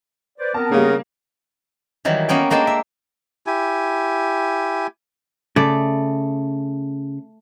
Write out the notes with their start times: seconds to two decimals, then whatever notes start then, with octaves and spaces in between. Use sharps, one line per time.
0.38 B4 C5 D5
0.54 B3 C4 A#4 A5
0.72 C#3 G3 A#3
2.05 D#3 E3 F#3 G3
2.29 A#3 B3 C#4 G5
2.50 G#3 A#3 D4 G5 A5 C6
2.67 E5
3.46 E4 G4 G#5
5.56 C#3 A3 D5